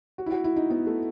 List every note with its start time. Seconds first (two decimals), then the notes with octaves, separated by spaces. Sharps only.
0.18 F#4
0.26 E4
0.31 F#4
0.44 E4
0.56 D#4
0.70 B3
0.87 A3